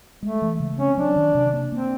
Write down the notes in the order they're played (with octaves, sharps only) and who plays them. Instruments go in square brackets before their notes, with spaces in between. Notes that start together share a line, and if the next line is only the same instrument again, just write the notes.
[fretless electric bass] G#3 [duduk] A3
[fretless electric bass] E3
C#3
[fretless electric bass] C4 [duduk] C#4
[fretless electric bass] F#3 [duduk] D4
[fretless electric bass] D#3
C3
A#3
[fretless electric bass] A#3 [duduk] C4